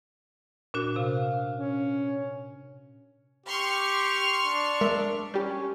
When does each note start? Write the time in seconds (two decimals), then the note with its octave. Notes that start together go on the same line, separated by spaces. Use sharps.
0.74 A#2 D4 F#4
0.96 C3 F5
1.55 C#4
3.46 G4 C6 C#6 F6
4.45 D4
4.81 G#3 A#4 E5
5.34 G3 C#4 G4